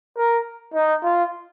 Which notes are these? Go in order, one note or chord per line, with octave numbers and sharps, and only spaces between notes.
A#4
D#4
F4